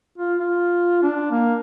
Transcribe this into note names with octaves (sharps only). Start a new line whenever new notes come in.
F4
F4
D4
A#3